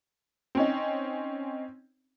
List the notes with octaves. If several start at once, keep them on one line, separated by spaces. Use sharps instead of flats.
C4 C#4 D#4